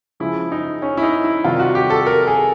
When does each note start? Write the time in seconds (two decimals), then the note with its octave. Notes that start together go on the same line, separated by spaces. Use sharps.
0.20 C#3 F3 G#3 E4
0.52 D#4
0.82 C#4
0.97 E4
1.03 D#4
1.24 E4
1.44 C3 D#3 G3 F4
1.59 F#4
1.75 G4
1.90 A4
2.06 A#4
2.27 G#4